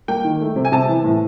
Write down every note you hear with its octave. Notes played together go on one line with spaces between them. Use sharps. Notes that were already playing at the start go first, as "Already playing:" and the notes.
A#3 G5
D#3
A3
C3
G#5
C3 A5
E3
A2